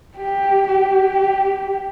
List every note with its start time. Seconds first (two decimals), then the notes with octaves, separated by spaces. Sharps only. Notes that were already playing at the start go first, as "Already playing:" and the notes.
0.17 G4
0.67 G4